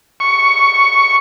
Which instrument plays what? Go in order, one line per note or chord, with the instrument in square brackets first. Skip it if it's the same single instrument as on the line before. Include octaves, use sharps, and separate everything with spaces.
[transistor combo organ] C#6